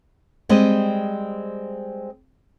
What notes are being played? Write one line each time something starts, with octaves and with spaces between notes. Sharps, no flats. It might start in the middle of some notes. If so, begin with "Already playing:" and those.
G3 G#3 C4 D#5